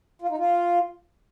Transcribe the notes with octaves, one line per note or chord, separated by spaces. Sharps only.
F4
D#4
F4